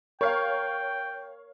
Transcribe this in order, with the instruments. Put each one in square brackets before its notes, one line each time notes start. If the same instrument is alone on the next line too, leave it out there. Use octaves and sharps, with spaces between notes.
[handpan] A#4 [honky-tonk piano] C#5 F5 [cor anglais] G5